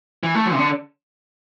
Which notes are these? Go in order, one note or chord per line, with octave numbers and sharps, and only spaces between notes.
E3
A3
F#3
C3
D3